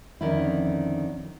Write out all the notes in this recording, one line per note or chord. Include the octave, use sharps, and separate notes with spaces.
F2 D3 D#3 C#4 E4